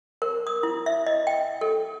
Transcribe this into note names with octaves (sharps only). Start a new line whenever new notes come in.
A#4
D#6
E4
E5
D#5
G5
A4